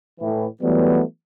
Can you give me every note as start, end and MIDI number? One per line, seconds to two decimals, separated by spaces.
0.20 0.46 45
0.20 0.46 52
0.62 1.01 52
0.62 1.01 54
0.62 1.01 55
0.62 1.01 57
0.62 1.01 59